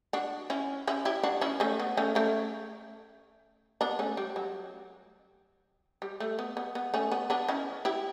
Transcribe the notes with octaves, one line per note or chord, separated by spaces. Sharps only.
D4 F#4
C#4 E4
C#4 E4
E4 G4
D4 F#4
C#4 E4
A3 C#4
B3
A3 C#4
A3 C#4
B3 D4
A3 C#4
G3
F#3
G3
A3
B3
B3
B3
A3 C#4
B3
B3 D4
C#4 E4
E4 G4